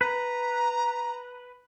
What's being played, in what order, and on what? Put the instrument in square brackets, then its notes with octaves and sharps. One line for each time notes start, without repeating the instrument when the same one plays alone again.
[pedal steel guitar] B4 [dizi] A#5